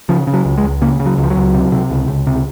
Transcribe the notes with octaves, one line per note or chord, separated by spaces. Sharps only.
C#3 F3
C#3
F#3
C#2
G#3
C#2
C#3 A#3
C#3
F#3
C#2
F3
F#3
C#2
C3
C3
C#2
C#2
C3